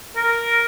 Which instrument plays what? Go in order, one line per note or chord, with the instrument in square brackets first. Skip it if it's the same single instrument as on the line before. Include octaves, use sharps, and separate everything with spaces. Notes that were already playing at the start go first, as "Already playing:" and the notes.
[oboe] A#4